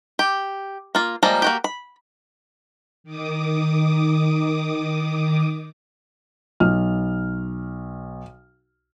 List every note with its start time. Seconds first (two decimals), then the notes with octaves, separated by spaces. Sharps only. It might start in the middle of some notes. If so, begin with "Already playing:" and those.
0.19 G4
0.95 A#3 F4
1.23 F3 G3 G#3 A#3 A#5
1.42 A#3 F#4 G4
1.64 B5
3.04 D#3 D6 D#6
6.60 B1 F6